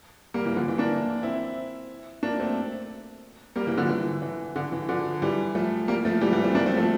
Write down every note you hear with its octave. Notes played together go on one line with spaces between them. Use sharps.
G3 A#3
E3
D3 F3
E3
A#3 D4
C4 E4
A#3 D4
A3 C4
G3 A#3
E3 G3
D3 F3
E3
E3
D3
E3
D3 F3
E3 G3
F3 A3
G3 A#3
F3 A3
E3 G3
E3 G3
A3 C4
A#3 D4
A3 C4
F3 A3